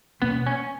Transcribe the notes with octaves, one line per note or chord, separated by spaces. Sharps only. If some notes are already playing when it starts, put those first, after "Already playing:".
B2 A#3 B3 C#4
C#4